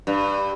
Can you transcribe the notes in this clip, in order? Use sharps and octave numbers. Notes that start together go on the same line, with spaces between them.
G2